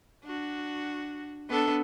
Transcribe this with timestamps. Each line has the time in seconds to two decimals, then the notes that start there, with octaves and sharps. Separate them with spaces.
0.24 D4 F#4
1.49 B3 D4 A4